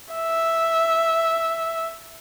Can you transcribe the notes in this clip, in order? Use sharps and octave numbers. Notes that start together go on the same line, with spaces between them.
E5